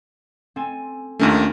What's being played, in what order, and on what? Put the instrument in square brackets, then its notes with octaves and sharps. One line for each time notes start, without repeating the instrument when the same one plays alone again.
[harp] C4 A4 G#5
[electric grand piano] D#2 D#3 A3 [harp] C#4 D4 F4